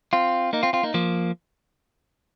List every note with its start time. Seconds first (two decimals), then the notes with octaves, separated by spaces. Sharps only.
0.13 C4 F4
0.53 A#3 D#4
0.63 C4 F4
0.73 C4 F4
0.83 A#3 D#4
0.94 F3 A#3